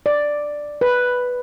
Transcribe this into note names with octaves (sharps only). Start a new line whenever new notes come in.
D5
B4